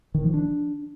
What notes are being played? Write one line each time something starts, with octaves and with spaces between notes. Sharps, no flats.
D#3
F3
D4